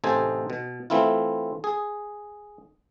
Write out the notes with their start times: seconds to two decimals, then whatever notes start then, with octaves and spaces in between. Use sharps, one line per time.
0.04 A1 C3 D#4 A4 C5 G#5
0.50 B2
0.90 E3 A3 C4 E4 F4
1.64 G#4